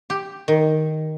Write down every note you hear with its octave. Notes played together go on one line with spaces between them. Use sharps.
G4
D#3